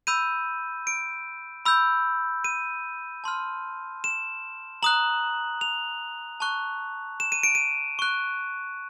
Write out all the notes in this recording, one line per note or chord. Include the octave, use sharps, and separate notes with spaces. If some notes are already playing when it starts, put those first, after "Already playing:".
B5 E6 G6 D#7
D7
B5 E6 G6
D#7
A5 C6 F6
E7
A#5 D#6 F#6 F#7
F7
A5 C#6 F#6
E7
D#7
D7
D#7
C#6 F#6